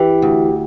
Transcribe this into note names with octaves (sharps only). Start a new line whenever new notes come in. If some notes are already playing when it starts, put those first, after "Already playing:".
Already playing: E3 G4
D2